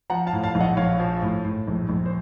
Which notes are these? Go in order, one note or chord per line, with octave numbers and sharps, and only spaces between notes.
F3 F#5 A#5
F5 A5
A2
F5 A5
A#1
D#5 F#5
A#1 C#5 F5
F3
A2
A2
A#1
A#1
C5